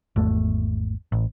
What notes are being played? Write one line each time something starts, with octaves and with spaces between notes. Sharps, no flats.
G#1 E2 A3
A1